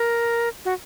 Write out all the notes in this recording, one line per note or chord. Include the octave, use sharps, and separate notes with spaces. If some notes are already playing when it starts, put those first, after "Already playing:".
Already playing: A#4
F#4